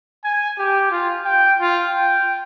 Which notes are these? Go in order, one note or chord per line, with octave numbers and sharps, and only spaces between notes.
G#5
G4
F4
G5
F4
G5